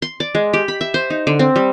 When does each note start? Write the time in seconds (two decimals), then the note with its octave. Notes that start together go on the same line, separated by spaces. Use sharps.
0.02 C6
0.20 D5
0.35 G#3
0.53 G4
0.68 B5
0.81 E5
0.94 C5
1.10 D#4
1.27 D3
1.39 C4
1.56 G3